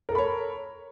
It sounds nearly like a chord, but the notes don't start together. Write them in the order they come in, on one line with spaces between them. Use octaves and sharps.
A#4 A4 B5 C#5